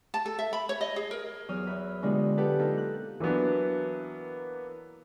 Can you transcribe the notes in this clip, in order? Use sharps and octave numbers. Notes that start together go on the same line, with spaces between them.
A5
A4
E5
B5
C#5
D#5
G#4
A#4
E2 F#3 D#6 F6
F#4 E5 B5
B2 D3 G#3 D4 F4 G4
G4 A4 B4 F#5 A5
A#3 D#4 F4 A4
F#6
E3 F#3 A#3 B3 D4